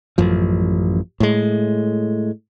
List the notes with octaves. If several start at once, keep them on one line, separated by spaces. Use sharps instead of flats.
A1 F#2 F3
A2 G#3